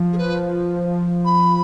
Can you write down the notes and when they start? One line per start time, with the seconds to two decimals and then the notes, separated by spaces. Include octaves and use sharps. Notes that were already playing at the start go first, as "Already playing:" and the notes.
Already playing: F3
0.13 G#4
0.18 B4
1.25 B5